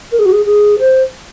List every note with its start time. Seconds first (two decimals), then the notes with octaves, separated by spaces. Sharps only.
0.12 A#4
0.19 G#4
0.25 F#4
0.32 G#4
0.46 G#4
0.79 C5